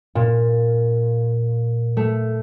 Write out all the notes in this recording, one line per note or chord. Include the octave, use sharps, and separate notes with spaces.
A#2
A3